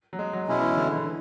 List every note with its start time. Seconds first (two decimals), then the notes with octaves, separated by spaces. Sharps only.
0.13 F#3
0.19 G#3
0.33 F#3
0.48 B2 G#3 C#4 E4
0.61 E3
0.76 D3
0.96 D3
1.05 E3